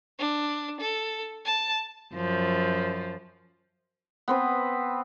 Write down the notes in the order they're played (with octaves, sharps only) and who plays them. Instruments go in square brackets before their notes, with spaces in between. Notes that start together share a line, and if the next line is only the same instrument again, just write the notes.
[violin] D4
A4
A5
[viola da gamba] F#2 F3
[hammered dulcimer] B3 C4 B4